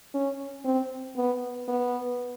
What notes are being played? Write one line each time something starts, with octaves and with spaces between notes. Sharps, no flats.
C#4
C4
B3
B3